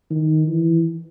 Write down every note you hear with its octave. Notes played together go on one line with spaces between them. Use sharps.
D#3
E3